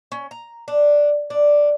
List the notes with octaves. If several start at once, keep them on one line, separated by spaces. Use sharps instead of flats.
C#4
A#5
D4
D4